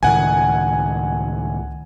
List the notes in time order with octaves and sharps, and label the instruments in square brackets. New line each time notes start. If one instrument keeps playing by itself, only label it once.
[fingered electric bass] C#2 A2 D#3 [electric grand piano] F#5 G#5